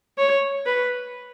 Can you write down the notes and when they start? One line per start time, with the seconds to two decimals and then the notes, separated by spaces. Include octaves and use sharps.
0.18 C#5
0.66 B4